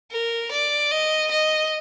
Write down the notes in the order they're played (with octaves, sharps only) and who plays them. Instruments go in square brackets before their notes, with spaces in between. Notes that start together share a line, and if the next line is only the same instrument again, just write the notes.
[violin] A#4
D5
D#5
D#5